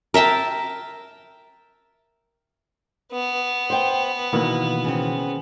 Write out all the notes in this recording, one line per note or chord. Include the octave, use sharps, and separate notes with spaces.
A#4 E5 G5 A5
B3
C5 G5
B2 D#3 E3 A#3
C#3 C4